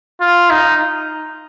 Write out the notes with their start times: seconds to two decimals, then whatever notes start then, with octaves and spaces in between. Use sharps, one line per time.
0.21 F4
0.50 D#4